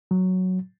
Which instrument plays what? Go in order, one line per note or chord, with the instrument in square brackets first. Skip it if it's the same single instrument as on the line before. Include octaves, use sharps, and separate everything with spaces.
[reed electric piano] F#3